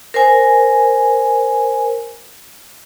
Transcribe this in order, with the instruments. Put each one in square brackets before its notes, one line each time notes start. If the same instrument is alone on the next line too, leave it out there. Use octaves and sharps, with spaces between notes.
[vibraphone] A#4 C5 G#5